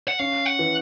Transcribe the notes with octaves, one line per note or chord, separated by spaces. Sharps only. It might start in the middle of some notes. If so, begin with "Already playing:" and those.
F#5
C#4 F5
F#5
E3